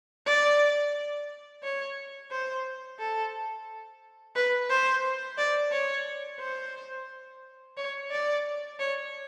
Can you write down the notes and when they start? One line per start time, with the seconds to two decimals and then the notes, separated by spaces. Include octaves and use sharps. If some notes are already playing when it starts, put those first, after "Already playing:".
0.26 D5
1.63 C#5
2.31 C5
2.99 A4
4.36 B4
4.70 C5
5.38 D5
5.72 C#5
6.40 C5
7.77 C#5
8.11 D5
8.79 C#5